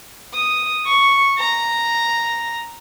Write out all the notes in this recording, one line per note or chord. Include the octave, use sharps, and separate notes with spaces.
D#6
C#6
A#5